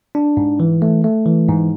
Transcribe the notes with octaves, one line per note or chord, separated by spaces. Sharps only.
D4
G#2
E3
A3
A3
E3
G#2